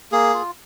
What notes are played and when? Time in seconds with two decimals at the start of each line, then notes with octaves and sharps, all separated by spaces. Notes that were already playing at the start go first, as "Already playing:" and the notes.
0.12 A#3 G#4
0.34 F4